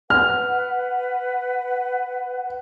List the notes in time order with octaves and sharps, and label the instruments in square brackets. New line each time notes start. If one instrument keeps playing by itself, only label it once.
[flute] B4 [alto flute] F#5 [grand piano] F6